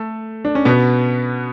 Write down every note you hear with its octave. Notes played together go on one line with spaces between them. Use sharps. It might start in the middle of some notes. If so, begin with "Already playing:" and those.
Already playing: A3 A4
D4
C#4
B2 B3